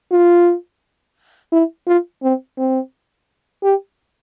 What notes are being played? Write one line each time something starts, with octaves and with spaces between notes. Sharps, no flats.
F4
E4
F4
C4
C4
G4